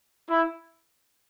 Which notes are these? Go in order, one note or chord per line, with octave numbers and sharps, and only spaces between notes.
E4